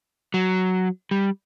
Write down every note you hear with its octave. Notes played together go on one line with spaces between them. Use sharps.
F#3
G3